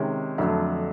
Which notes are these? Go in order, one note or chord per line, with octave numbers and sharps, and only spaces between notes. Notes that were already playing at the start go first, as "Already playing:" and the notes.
Already playing: C3 D#3 G#3 C#4
F2 D3 F#3 A3 D4